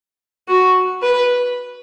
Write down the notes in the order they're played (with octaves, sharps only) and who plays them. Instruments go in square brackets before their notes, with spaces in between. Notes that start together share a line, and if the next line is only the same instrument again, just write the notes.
[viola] F#4
B4